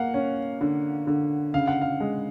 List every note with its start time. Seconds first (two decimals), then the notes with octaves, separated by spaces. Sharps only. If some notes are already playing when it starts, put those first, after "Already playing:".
Already playing: A#3 F5 F#5
0.14 C#4
0.61 D3
1.07 D3
1.54 C#3 F5
1.67 F#5
1.81 F5
2.00 G#3